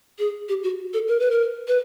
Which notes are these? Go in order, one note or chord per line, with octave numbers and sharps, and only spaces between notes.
G#4
G4
F#4
A4
A#4
B4
A#4
B4